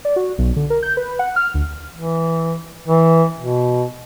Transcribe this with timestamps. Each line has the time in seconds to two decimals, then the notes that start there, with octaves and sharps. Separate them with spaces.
0.05 D5
0.16 F#4
0.38 B1
0.56 D3
0.70 A#4
0.83 G6
0.97 B4
1.19 F#5
1.36 F6
1.54 D2
1.95 E3
2.88 E3
3.39 B2